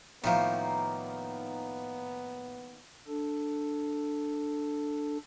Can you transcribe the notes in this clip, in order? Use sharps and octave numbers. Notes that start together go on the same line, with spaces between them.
A2 D#3 F3 A#3 B3
D4 A4